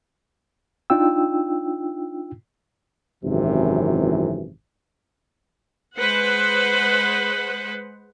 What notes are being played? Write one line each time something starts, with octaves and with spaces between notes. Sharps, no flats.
D4 D#4 F4 G5 E6
G#1 F#2 C3 E3
G#3 B4 C5 F#5